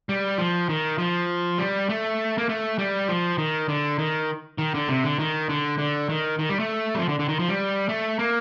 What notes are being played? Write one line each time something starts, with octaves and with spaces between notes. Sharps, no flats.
G3
F3
D#3
F3
G3
A3
A#3
A3
G3
F3
D#3
D3
D#3
D#3
D3
C3
D3
D#3
D3
D3
D#3
D#3
G3
A3
G3
F3
D3
D3
D#3
F3
G3
A3
A#3